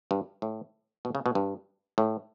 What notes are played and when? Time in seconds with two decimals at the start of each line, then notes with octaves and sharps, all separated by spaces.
0.11 G2
0.42 A2
1.05 B2
1.15 C#3
1.26 B2
1.35 G2
1.98 A2